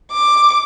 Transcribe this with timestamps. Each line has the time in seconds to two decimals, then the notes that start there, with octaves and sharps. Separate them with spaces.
0.11 D6